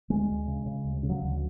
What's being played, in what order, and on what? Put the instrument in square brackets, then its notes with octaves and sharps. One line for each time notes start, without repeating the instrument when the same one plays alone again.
[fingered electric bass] D2 G#3
D2
C#3
C#3
D2
C#3
F#3
D2